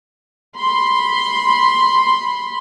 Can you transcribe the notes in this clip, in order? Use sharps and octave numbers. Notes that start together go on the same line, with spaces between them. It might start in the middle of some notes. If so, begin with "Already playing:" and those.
B5 C6